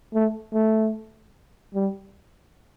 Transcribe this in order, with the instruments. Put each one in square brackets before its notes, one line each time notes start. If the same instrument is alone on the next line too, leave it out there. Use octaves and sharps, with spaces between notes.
[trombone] A3
A3
G3